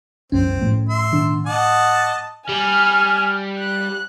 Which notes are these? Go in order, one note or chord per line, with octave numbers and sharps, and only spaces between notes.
C2 F#2 F3 C4 C#4
A2 F3 A3
E5 C6
B2 D#3 D4
D#5 F#5 A5 D6
G3 G#5 F6
F#6